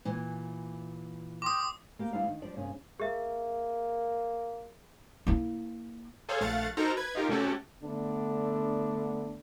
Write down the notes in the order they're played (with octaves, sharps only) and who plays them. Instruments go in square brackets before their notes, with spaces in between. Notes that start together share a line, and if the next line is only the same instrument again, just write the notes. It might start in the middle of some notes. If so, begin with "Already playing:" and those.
[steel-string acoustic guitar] A#2 E3
[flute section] G5 C6 F6 [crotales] D6 D#6
[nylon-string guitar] A#3 G4
G3 B3 D4 E4 G4 F5
D#3
F3 G3 D4 D5
G2 C3 A#3 C#4 G#4
[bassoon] A#3 [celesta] G#4 E5
[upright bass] A#3 E4
[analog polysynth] G#4 A4 C5 C#5 F5
A#1 A3 F5 F#5 A6
D#4 F#4 A4 A#4 C5 A#5
B4 G#6
D#4 F4 G4 A#4
C3 A3 C#4 F#4 G4 A4
[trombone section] D3 A3 B3 D4